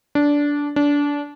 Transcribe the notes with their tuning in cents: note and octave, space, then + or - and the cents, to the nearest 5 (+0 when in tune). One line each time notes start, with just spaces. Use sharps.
D4 -15
D4 -25